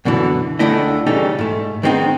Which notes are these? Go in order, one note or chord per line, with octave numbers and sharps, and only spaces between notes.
F#2 B2 D3 E3
C#2 D3 A3 E4 D#5
C#3 E3 G3 C#4 D#4 A4
G#2 A3
D#3 G#3 B3 C4 D4 D#4